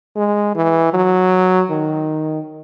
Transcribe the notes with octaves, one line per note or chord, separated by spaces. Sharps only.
G#3
E3
F#3
D#3